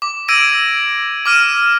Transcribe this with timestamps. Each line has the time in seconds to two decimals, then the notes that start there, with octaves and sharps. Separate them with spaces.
0.02 D6
0.28 E6 G#6 A#6 D7 D#7
1.26 D6 F6 D#7 E7